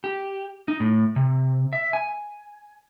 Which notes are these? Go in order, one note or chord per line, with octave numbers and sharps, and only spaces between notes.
G4
D#4
A2
C3
E5
G#5